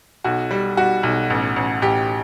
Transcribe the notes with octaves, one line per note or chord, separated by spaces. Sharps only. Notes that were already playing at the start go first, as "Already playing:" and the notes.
B1 F#4
G3
G3 F#4
B1
A1
A1
A1 G4